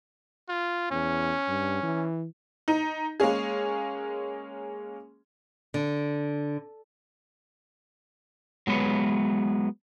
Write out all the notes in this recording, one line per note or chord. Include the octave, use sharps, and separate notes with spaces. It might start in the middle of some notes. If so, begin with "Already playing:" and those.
F4
E2 C#4
G2
E3
D#4
G#3 A#3 C#4 G#4
D3
F#3 G#3 B3 B4 C#5